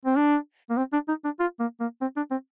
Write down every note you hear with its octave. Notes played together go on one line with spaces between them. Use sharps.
C4
D4
A#3
C4
D4
D#4
D4
F4
A#3
A#3
C4
D4
C4